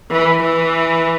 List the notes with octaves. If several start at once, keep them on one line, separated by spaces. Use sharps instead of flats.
E3
E3